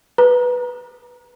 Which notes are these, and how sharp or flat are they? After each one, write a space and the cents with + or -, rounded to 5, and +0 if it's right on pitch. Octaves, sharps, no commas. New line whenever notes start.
B4 +0 A#5 +20